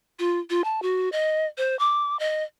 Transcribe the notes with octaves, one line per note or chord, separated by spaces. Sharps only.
F4
F4
A5
F#4
D#5
C5
D6
D#5